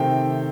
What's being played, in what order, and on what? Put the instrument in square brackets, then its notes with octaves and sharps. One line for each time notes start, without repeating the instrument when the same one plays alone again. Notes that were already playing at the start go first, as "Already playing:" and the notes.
Already playing: [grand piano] C3 D#3 A3 C4 G5